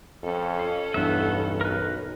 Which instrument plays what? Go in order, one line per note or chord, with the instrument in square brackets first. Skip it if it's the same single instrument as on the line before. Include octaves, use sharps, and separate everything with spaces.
[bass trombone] F2 [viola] C#4 A4
[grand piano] C7
[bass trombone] B1 [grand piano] E2 G2 [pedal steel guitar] B3 E5
[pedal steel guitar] A#4 B4